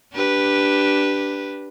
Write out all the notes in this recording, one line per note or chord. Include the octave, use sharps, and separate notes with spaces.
D4 G4 B4